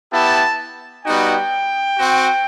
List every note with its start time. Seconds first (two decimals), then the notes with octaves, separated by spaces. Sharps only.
0.13 B3 E4 G4 A5
1.05 G3 B3 D#4 F#4 G5
1.96 C4 F#4